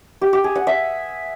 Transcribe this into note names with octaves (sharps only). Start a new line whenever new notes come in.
G4
G4
G#4
F#5
E5